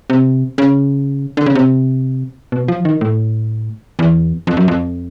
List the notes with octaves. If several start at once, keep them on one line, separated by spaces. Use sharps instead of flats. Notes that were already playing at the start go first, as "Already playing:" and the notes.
C3
C#3
D3
C#3
C3
B2
F3
D#3
A2
E2
F2
F#2
F2